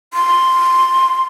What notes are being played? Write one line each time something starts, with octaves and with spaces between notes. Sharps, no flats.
C6